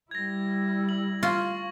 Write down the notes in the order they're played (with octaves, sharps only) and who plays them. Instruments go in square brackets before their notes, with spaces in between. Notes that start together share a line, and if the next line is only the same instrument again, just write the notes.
[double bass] G3 E4 [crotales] G#6 A#6
[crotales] F#7
[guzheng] F4 [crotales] C#6